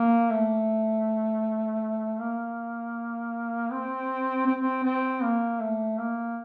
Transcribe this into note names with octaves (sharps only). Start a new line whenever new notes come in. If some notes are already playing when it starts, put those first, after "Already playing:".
Already playing: A#3
A3
A#3
C4
C4
C4
C4
A#3
A3
A#3